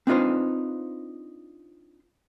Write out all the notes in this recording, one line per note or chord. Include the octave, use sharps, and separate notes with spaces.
C4 D4 D#4 F4 B4 C5